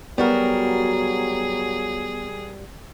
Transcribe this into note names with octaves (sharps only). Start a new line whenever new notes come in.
F#3 G3 B3 F#4 G#4 A#4